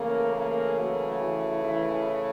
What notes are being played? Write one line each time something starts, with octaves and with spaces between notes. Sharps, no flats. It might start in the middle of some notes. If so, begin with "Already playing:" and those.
Already playing: C#3 E3 A3 A#3 A#4
A#3 A#4
F#3 F#4
E3 E4
E3 E4